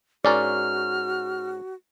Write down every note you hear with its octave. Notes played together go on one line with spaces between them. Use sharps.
G#2 C#4 F#4 A#4 D5 F6